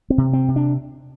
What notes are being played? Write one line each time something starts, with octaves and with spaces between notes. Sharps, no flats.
C4
C3
C4
C3
D4